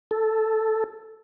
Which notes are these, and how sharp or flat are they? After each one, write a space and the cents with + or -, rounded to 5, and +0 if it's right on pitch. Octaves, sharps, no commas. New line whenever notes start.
A4 +0